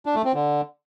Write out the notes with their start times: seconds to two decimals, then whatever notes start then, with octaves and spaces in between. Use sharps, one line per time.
0.06 D4
0.15 A3
0.25 C4
0.34 D3